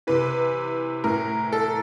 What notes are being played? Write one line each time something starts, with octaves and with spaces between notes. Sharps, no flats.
C3 E3 B4
A2 E3 A#4
A4